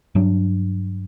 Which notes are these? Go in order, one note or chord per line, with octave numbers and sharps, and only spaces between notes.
G2 F#3 D4